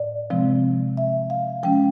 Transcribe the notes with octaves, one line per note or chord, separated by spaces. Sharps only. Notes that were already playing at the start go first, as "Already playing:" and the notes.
Already playing: A2 D5
C3 F3 G#3 C4
E5
F5
F3 G#3 C#4 G5